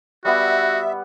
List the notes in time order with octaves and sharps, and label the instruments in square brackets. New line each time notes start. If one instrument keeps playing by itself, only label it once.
[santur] G3 B3 F#5 [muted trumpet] F#4 [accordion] E5